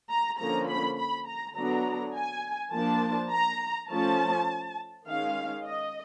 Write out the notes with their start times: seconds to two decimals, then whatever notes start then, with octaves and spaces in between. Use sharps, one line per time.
0.10 A#5
0.39 D3 F3 A#3 C#4 A#5
0.69 B5
0.98 B5
1.28 A#5
1.56 D3 F#3 B3 D4 A#5
2.15 G#5
2.73 F3 A#3 D4 A5
3.32 A#5
3.90 F3 A3 C#4 A5
5.07 D#3 G#3 C#4 F5
5.65 D#5